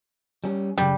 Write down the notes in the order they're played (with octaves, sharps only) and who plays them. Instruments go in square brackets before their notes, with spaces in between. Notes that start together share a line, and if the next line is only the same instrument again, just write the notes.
[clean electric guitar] G3 C#4
[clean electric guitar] F#2 C#3 [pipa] G3